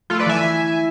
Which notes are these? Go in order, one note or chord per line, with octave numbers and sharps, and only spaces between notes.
A3 F4 A4
B4 D5
E3 E5 G#5